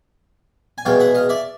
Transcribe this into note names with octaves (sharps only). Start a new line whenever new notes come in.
G#5
E2 B2 G#3 F5 G5
E5 F#5
D#5 F5
D5 E5